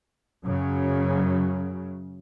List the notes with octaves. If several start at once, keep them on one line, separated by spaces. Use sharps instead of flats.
F#2 C#3 F#3